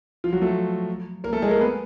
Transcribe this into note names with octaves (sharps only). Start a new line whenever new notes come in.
F3 F4
F#3 F#4
A3 A4
A#3 A#4
A3 A4
G#3 G#4
A#3 A#4
B3 B4